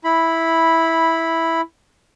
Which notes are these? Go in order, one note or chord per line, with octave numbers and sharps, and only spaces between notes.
E4 B5